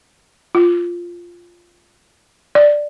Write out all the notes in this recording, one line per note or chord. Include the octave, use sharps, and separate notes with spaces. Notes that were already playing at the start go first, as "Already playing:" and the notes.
F4
D5